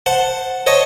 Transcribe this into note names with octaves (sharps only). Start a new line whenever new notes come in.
C5 F#5 A5
C5 C#5 D#5 A5